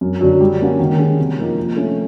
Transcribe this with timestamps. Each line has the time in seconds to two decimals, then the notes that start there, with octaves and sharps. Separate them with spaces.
0.01 F#2
0.21 D3 F#3
0.41 G3
0.60 A#3 C#4 F#4
0.79 D#3
0.99 G#3 C#4
1.18 C3
1.38 F3 A#3 D#4
1.57 F3
1.76 A3 C#4